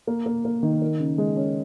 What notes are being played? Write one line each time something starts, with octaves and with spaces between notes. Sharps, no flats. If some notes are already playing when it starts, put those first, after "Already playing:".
A#3
A#3
A#3
D#3
A#4
C#3
G#3
C#4